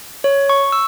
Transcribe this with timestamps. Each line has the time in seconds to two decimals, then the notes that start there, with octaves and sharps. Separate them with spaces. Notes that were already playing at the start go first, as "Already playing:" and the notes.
0.24 C#5
0.49 C#6
0.72 E6